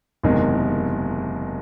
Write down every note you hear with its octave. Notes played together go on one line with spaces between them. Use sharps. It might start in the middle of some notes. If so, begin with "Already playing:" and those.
F#1 E2 C3 D#3 G#3